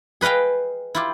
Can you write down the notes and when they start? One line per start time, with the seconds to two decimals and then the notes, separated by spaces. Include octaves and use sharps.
0.21 G#4 B4 D#5 F5 G5
0.95 E4 F4 G4